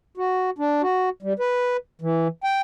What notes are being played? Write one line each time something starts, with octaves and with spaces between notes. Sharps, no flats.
F#4
D4
F#4
G3
B4
E3
G5